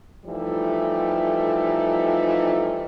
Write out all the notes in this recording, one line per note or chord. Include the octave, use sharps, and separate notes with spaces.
E3 F3 G3 A3 D#4